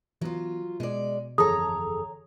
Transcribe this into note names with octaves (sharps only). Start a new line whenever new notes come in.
E3 F#3 B3 F4
B2 G#3 D5
G1 F2 E3 G#4 A4 C#5 A#5 D#6